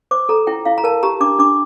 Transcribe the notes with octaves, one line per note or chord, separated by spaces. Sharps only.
C5 D6
A4 A#5
E4 G5
E4 F5
A#5
A#4 A5
G4 A#5
D4 D6
D4 D6